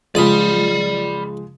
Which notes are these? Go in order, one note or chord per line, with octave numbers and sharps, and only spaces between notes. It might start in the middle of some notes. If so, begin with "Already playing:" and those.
C#2 F3 G#3 D5 B5 D#6